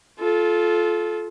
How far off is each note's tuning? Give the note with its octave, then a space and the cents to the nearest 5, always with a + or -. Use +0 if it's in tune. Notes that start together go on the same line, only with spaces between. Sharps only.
F4 +0 A4 -25